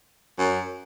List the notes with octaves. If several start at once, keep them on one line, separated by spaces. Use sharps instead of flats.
F#2